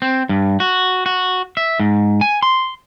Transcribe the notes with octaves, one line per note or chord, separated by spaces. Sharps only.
C4
G2
F#4
F#4
E5
G#2
G#5
C6